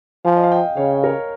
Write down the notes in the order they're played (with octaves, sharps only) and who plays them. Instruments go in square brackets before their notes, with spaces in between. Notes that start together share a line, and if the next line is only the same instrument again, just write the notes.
[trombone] F3 [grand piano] F5 G#5
[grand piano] D#5
F5
D#5 G5
[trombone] C#3 [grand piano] C#5 F5
[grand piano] A#4 C#5